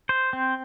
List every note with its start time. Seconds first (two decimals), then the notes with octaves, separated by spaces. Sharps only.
0.09 C5
0.33 C4